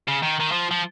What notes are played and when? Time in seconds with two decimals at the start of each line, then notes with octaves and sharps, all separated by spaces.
0.08 C#3
0.23 D#3
0.40 D#3
0.52 F3
0.71 F3